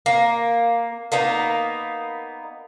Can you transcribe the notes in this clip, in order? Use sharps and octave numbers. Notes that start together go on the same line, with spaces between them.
A#3
A#3 B3 D#4